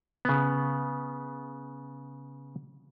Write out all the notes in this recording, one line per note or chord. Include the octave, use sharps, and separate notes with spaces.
C#3 B3